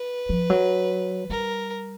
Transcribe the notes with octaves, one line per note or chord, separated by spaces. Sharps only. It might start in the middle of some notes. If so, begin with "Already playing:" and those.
Already playing: B4
F3
F#3
G3 A#4